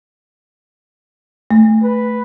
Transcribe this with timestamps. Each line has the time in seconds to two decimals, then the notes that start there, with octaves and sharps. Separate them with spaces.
1.51 A3
1.83 B4